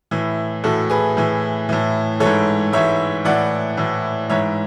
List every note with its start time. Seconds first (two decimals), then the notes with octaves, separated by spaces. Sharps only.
0.11 A2 E3
0.64 A2 E3 F#4 A4
0.90 G#4 B4
1.17 A2 E3
1.69 A2 E3
2.20 E3 A4 C#5
2.26 G#2
2.72 G#2 E3 C#5 E5
3.25 A2 E3 D5 F#5
3.77 A2 E3
4.29 G#2 E3 C#5 E5